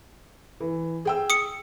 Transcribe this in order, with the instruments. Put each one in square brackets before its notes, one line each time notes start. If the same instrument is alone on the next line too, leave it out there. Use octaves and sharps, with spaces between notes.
[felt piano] E3
G#4 G5 E6
[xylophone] D#6 C#7